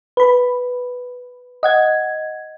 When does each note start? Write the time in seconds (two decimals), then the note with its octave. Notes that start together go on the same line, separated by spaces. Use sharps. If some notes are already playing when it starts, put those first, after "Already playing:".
0.17 B4 B5
1.63 D#5 F#5 G#6